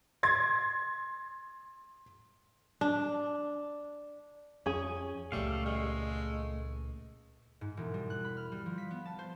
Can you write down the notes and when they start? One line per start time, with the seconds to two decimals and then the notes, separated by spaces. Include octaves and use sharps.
0.23 C6 G#6 A6
2.81 D4
4.66 F2 C#4 G#4
5.32 C#2 A#2 G3 A3 F5
5.65 G#3
7.61 G#2
7.77 E1
7.94 G3
8.10 F#6
8.25 B5
8.37 F6
8.52 G3
8.66 F3
8.78 B6
8.91 B3
9.05 A5
9.19 C5